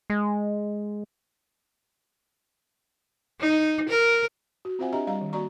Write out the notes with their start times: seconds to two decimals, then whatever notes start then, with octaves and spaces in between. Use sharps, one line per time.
0.10 G#3
3.40 D#4
3.89 A#4
4.65 F#4
4.79 C4 F4 C5 E5 F#5 G#5
4.92 D4 G4 D#5 E5 A#5
5.07 G3 D5 D#5 F5 A#5
5.21 D#3
5.33 A#3 F#4 D5 A#5 C#6